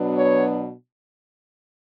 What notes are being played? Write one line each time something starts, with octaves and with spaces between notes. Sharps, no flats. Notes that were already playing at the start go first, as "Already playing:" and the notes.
Already playing: B2 F#3 B3 D4
C#5